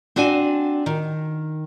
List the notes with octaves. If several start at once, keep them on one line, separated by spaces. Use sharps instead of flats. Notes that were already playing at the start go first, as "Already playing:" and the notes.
C4 D4 F#4 D#5 G#5
D#3